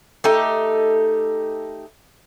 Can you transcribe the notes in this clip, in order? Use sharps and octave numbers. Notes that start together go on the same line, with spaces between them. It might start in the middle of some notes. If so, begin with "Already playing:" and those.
A3 D#4 G4